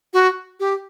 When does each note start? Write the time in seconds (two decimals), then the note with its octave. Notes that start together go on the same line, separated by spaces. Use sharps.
0.13 F#4
0.60 G4